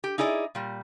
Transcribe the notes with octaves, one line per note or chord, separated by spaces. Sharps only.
G4
D#4 E4 G#4 D5 D#5
A#2 G3